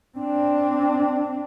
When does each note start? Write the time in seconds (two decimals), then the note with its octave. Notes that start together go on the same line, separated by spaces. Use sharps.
0.18 C4 D4